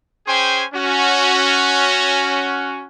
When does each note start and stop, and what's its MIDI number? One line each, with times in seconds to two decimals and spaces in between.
0.27 0.64 61
0.27 0.64 68
0.27 0.64 72
0.27 0.64 79
0.27 0.64 80
0.27 0.64 84
0.73 2.87 61
0.73 2.87 66